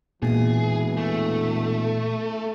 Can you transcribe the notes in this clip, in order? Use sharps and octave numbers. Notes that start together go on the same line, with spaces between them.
E1 A#2 E3 G#4
A3